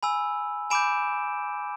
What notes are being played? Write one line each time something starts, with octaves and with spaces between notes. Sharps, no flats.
G#5 B5 E6
G#5 B5 D6 G6 D7 E7